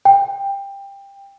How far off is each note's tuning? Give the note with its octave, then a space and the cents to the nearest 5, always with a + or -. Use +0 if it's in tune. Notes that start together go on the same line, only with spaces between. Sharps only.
G5 +20